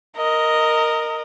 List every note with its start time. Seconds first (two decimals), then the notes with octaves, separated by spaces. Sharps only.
0.17 A#4 D#5